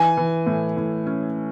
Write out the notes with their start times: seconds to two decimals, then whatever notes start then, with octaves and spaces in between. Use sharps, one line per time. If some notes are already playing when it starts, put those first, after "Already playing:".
Already playing: E3 G#5
0.17 E3
0.47 A2
0.77 A2
1.06 C#4